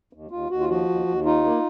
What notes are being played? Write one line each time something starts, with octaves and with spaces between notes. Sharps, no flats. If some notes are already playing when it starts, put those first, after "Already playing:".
D#2
D#2 F4
D#2 F#4
F4
F3 F#4
D#2
D#2
D#4 F4
A#3